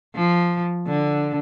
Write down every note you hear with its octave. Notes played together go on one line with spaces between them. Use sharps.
F3
D3